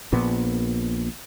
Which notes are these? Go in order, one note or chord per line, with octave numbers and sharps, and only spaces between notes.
A#1 A#2 B3